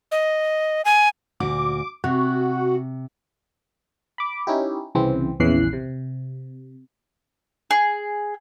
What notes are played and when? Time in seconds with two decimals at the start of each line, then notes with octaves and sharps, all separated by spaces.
0.12 D#5
0.85 G#5
1.40 D2 A#2 F#4 D6
2.04 C3 F#4
4.18 B5 D6
4.47 C#4 D#4 E4 G4
4.95 C2 C#3 E3 C4
5.40 A#1 E2 C#3 E3 F#6 C7
5.73 C3
7.71 G#4